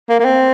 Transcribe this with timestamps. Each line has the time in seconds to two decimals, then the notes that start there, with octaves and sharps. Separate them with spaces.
0.09 A#3
0.20 A#3
0.25 C4